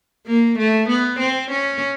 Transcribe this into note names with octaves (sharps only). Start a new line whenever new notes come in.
A#3
A3
B3
C4
C#4